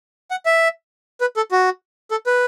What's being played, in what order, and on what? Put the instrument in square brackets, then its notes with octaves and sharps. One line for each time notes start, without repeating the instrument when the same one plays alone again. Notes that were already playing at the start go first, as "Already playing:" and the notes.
[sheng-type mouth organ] F#5
E5
B4
A4
F#4
A4
B4